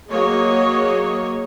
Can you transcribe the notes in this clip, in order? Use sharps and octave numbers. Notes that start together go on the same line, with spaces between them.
F#3 A#3 F#4 G#4 C#5 D#5